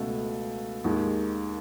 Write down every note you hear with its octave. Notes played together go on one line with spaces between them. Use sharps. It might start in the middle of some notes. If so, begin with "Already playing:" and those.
Already playing: C#2 B2 A3
D#2 D#3 G#3